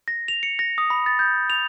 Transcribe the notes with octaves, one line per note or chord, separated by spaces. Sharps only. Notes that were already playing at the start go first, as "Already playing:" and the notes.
A#6
F7
C#7
A#6
D#6
B5
A6
G6
F7